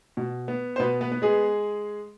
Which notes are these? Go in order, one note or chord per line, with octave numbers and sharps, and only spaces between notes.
B2
B3
C5
B2 B3 B4
B3 B4
B3
G#3 G#4